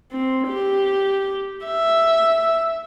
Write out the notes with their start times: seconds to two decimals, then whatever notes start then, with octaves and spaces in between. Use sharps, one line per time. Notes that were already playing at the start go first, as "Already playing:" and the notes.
0.12 C4
0.48 G4
1.66 E5